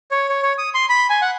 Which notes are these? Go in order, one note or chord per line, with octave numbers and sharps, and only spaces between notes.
C#5
C#5
C#5
D#6
C6
B5
G#5
F#5